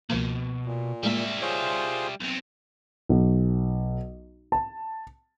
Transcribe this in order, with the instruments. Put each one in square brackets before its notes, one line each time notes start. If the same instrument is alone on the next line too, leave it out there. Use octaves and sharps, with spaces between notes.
[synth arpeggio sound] C#2 F3 A#3 [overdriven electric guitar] B2
[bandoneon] A#2
[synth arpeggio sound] A2 G#3 A#3 [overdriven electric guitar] G3 E5
[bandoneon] F4 G#4 C5 [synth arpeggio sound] C#5
[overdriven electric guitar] B1 C3
[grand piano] B1
A5